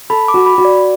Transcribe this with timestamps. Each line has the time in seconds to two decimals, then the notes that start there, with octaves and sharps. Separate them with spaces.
0.10 A4 B5
0.28 D6
0.34 F#4
0.46 B5
0.58 F#4
0.65 D5